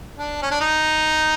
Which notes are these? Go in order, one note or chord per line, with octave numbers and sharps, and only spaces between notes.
D4
C#4
D4
D#4